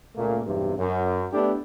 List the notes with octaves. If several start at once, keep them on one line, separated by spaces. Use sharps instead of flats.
C#2 A#2 A3 A#3
B1 E2 G2 C3
F#2
A3 B3 D4 E4 G4 A4